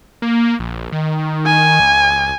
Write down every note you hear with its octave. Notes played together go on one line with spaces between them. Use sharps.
A#3
A#1
D#3
G#5
C#2